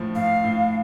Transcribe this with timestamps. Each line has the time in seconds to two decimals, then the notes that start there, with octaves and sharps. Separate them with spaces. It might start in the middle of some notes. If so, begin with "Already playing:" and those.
Already playing: A2 F3 A3
0.15 A2 F5
0.44 A2